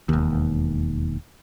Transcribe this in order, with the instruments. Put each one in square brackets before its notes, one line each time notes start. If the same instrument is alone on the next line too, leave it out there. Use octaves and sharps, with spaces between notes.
[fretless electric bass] E1 D#2